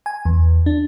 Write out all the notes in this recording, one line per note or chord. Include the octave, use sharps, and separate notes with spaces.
G#5
E2
D4